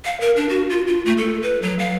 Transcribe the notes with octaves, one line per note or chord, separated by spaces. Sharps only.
F5
A#4
D4
F#4
F4
F4
A3
A4
B4
F#3
F5